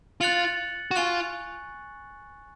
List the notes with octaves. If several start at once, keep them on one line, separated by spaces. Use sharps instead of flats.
F4 F#6 A6 C#7 F#7
F#4
F4 G#5 C#6 F#6